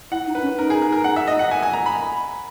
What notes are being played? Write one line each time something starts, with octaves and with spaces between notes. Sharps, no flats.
E4 F#5
D#4
B4
C#4
D#4 A#4
G#4
A#4
A#4
F#5
E5
D#5
F#5
G#5
G#5
A#5
B5